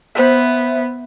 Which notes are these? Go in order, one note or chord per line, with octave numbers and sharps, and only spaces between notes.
B3 C5 E5